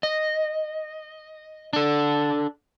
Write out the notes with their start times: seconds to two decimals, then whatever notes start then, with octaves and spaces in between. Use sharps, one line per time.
0.03 D#5
1.73 D4 A4